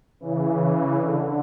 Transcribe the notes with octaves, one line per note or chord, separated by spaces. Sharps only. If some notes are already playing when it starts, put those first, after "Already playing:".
C#3 E3
C#3
D3